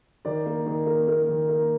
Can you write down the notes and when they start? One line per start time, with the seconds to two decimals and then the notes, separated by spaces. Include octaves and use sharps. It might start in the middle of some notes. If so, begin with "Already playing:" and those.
0.25 D#3 D5
0.46 A#3
0.66 D#3
0.86 A#3
1.07 A#3 A#4
1.29 D#3
1.49 A#3